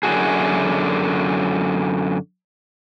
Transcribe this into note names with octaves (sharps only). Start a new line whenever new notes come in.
F#2 D3 F#4 G#4